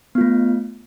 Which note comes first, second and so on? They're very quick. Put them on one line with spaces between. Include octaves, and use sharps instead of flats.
B3 F4 A3